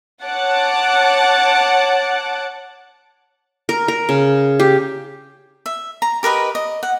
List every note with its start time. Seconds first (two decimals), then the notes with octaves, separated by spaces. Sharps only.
0.23 C#5 F#5 A5 D6 F#6
3.69 A#4
3.88 A#4
4.09 C#3
4.60 G4
5.66 E5
6.02 A#5
6.23 G4 A#4 B4 D#5
6.55 D#5
6.83 F#5